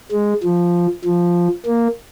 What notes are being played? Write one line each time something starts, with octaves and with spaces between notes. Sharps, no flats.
G#3
F3
F3
A#3